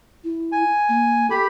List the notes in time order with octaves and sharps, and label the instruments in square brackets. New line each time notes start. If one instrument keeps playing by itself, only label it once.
[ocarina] E4
[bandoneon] G#5
[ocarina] A#3
[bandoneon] G4 B5 [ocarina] A4